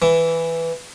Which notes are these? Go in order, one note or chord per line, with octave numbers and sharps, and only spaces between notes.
E3